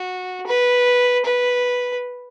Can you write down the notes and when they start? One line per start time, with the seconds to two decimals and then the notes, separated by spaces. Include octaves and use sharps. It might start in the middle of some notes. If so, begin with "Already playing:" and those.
Already playing: F#4
0.47 B4
1.25 B4